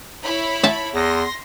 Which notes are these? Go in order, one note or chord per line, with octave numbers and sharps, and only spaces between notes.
E4 C#5 B5
E5 A5
E2 C6 A#6